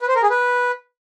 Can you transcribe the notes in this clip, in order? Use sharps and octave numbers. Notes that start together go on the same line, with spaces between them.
B4
C5
A#4
G#4
B4